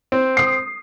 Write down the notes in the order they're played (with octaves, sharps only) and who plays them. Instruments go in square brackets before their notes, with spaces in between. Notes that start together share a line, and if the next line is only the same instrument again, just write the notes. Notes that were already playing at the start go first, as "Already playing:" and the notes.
[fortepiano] C4
[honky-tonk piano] D#6 C7